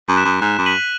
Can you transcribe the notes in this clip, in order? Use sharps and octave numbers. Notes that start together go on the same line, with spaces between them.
F#2
F#6 B6 E7
F#2
G#2 F#6
F#2
B6 D#7 F#7